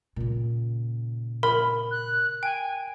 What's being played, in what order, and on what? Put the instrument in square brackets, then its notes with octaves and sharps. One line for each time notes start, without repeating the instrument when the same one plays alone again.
[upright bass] A#2 C#3
[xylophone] A#4 [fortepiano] B5
[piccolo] F#6
[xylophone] G5 [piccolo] G#5